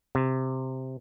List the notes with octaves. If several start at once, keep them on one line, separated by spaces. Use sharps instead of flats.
C3